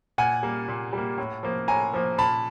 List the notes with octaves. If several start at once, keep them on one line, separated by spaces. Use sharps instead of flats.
A#2 F#5 G#5
G3 A#3
A#2
G3 A#3
A2
F3 A#3
A2 G#5 A#5
F3 A#3
A#2 A5 B5